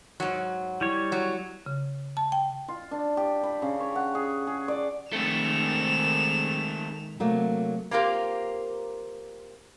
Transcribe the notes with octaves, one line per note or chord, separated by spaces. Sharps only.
G#2 F#3 F#5
G3 E4 C#5
F#3
C#3
A5
G5
F4
D4
G4
B5
C#3
C#5
F#5
G#4
G#4
D5
D#3 G#3 A3 C4 E7 F7
C3 F#3 A3 A#3
A#3 C4 F4 G4 A#4